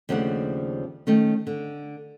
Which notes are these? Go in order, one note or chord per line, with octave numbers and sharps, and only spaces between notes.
D#2 C#3 F3 A3 D4 F#5
D#3 A3 C#4
D3